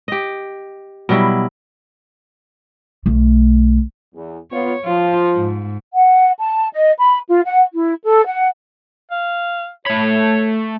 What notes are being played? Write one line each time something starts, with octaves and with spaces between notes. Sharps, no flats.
G4 D#5
B2 F#3 G3 E4
B1 A3
E2
B3 F4 C#5
F3 F4
G#2
F#5
A5
D#5
B5
F4
F#5
E4
A4
F#5
F5
A3 C#5 B5